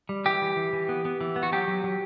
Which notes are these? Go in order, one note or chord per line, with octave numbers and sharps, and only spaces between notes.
G3
E3 G4
E3
E3
E3
B3
B3
E3
B3
F#4
F#3 G4
F#3
F#3